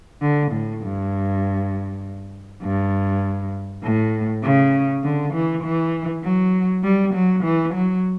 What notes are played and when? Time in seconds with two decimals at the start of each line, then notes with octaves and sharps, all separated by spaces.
0.21 D3
0.52 A2
0.82 G2
2.62 G2
3.83 A2
4.43 C#3
5.04 D3
5.34 E3
5.64 E3
6.24 F#3
6.84 G3
7.14 F#3
7.44 E3
7.74 F#3